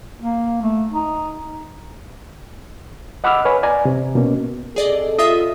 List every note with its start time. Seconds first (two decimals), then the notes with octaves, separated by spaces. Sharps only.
0.19 A#3
0.62 A3
0.91 D#4
3.24 D#5 F#5 B5 D6 E6 F6
3.45 B4 C#5 G#5 B5
3.63 D5 G#5 A#5
3.85 C3
4.15 B2 A#3 C#4
4.76 C3 G#4 A4 D5 D#5
5.19 F4 D#5 E5 D#6